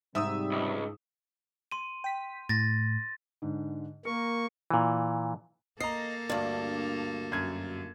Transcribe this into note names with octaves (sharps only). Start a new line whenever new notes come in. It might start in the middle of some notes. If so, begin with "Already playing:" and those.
G#2 C3 G3 E5 D#6 E6
C#2
C6 D#7
G5 B6
A2 A6 A#6
G#2 D3
A#3 A#4 C#6
A#2 E3
A#3 A4 D#5 A#5 C7
D2 G2 D5
F#2 G#6